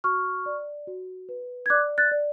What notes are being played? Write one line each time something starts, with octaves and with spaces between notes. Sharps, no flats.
F#4 C#6 F6
D5
F#4
B4
G#6
D5 D6 F#6
F#6 A6
D5